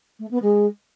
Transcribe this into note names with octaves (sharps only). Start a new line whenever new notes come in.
A3
B3
G#3